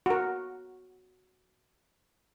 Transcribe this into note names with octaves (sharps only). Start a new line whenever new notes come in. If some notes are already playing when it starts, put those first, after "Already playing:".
F#4 A#4